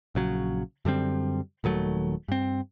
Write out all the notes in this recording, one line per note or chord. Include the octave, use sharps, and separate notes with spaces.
A#1 C#3 F#3
F#2 D3 G3 C4
D#1 D#3 F#3 A3
G2 C4